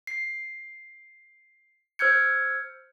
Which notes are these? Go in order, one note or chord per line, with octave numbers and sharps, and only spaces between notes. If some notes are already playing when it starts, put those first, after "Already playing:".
C7
C5 E6 F6 G6 G#6 C#7